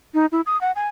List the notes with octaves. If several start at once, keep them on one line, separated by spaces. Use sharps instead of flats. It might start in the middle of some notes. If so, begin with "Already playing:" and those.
D#4
E4
D#6
F#5
G#5